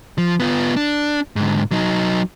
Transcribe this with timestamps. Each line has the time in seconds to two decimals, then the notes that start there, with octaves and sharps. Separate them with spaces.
0.18 F3
0.40 B3 F4
0.76 D4
1.36 G#2 D3
1.71 F#3 D#4